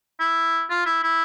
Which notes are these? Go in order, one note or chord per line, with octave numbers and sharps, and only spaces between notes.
E4
F4
E4
E4